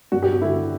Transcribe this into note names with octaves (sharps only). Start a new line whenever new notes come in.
G2 F#4
G4
F#4
D3 E4